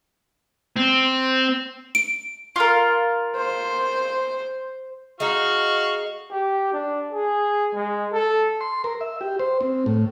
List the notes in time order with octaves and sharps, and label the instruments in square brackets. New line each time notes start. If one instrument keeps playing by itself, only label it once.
[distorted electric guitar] C4
[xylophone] D7
[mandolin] F4 A#4
[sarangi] C5
[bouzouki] G#3 D#4 [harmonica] F#4 F5 C#6
[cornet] G4
D4
G#4
G#3
A4
[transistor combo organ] C6
A#4
E5
G4
C5
C4
A2